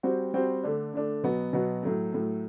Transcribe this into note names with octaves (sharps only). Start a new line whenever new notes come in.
G3 C4 F#4 C5
G3 C4 F#4 C5
D3 A3 D4
D3 A3 D4
B2 F#3 B3 F#4
B2 F#3 B3 F#4
A2 F#3 A3
A2 F#3 A3